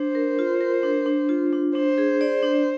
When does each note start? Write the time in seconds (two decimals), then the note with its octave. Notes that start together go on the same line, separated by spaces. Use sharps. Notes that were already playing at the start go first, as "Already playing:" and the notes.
Already playing: D4 C5
0.15 A#4
0.39 F4
0.61 A#4
0.83 D4
1.06 D4
1.29 F4
1.53 D4
1.75 D4 C5
1.98 G#4
2.21 D5
2.43 D4